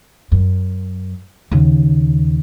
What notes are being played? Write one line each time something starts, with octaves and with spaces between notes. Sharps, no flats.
F#2
D#2 C#3